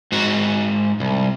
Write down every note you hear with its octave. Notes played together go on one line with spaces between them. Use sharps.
G#2 F#4
C2